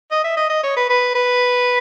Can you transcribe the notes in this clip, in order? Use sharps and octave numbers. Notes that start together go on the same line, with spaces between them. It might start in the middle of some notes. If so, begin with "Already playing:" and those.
D#5
E5
D#5
D#5
C#5
B4
B4
B4